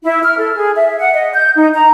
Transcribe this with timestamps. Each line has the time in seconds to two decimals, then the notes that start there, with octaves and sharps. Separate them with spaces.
0.03 E4
0.23 F6
0.38 A4
0.56 G#4
0.76 E5
0.99 F#5
1.13 D#5
1.34 G6
1.56 D#4
1.74 A#5